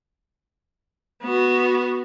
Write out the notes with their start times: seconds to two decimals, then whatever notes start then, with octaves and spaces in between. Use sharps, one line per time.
1.23 B3 F#4